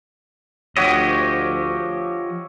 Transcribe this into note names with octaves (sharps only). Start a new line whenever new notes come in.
D2 F3 G4 C#5 D#5 E5 F#5